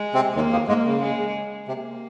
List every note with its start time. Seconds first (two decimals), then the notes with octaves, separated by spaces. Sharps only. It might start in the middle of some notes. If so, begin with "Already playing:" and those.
Already playing: G#3
0.14 C3 C4
0.35 D#2 D#3 A#3
0.52 F2 F3
0.68 G#2 G#3 A#3
0.85 C#3
1.02 G#3
1.67 C3 A#3